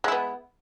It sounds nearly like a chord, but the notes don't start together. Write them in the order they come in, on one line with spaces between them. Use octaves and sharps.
G#3 E4 B3